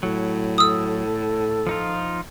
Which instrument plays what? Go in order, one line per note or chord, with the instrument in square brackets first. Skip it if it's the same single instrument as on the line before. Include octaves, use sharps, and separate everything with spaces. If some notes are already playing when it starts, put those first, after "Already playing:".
[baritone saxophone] A2 [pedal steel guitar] F#3
[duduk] A4 [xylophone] D#6 E6
[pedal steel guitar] F3 D#4 F4